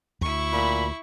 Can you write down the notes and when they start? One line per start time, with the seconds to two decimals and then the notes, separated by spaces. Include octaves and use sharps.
0.21 D2 E4 C#6
0.53 A#2 B5